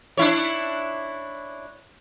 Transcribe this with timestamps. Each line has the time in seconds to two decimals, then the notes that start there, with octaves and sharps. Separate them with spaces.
0.17 D4 E4 C#5